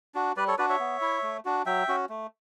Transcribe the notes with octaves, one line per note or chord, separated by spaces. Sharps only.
D4 F#4
G3 B4 D5
A4 C#5
D4 F#4 B4 D5
C#5 E5
B3
E4
A3
D4 F#4
F#3 E5 G5
C#4 F#4
A3